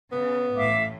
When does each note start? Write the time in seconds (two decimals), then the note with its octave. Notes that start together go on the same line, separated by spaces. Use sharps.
0.12 C#3 B3
0.56 A1 A2 E5 F5 D6